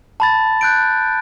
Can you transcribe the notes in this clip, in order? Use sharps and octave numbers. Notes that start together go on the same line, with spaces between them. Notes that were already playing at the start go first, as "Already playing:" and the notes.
A5 B5 A6
F#6 G6 D7